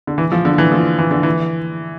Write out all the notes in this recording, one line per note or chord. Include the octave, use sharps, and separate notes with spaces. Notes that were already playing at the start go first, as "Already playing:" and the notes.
D3
E3
F3
D3
E3
F3
E3
D3
E3